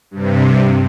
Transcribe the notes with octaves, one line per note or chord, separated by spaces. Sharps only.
G2 C3